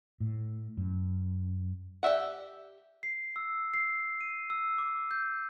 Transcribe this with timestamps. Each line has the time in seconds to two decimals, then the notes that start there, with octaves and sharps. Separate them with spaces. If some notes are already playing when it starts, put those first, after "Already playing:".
0.20 A2
0.77 F#2
2.03 G4 D5 E5 F#5
3.03 C7
3.36 E6
3.74 C7
4.21 D#7
4.50 E6
4.78 D6
5.11 G6